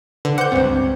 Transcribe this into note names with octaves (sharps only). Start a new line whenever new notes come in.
D3 B4
C5 F#5 D6 G6 C#7
C#2 G2 C4